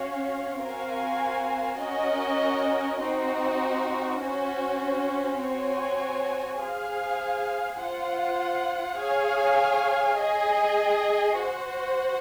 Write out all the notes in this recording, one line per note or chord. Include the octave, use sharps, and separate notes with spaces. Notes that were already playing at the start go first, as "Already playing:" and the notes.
Already playing: C#4 F#4 C#5 F5
C4 F#4 A#4 F5 G#5
C#4 F#4 A#4 D#5
C4 D#4 F#4
C#4 F#4 C5
C4 F#4 C#5 G#5
G#4 C5 F5 G#5
F4 C5 F#5
G#4 C#5 F5 G#5
G#4 D#5 G#5
F#4 C5 F#5